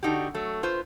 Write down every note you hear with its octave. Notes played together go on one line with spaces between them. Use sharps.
D3 D4 D#4 F#4 G4
F#3 A3
F4 B4 C5